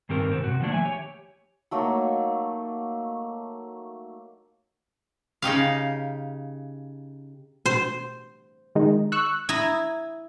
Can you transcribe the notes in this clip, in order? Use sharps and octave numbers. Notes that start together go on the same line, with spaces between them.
G2 D#3 C4 G4 A#4
G#2 B2 C4
C3 F#4
D#3 F3 A3 A#3 D4
E5 G#5
G4 C#5
F#3 A3 A#3 D#4
C#3 D#4 G4 F5
B2 C5
D#3 G#3 D#4
C#6 E6 F#6
E4 A#5 D#6 G#6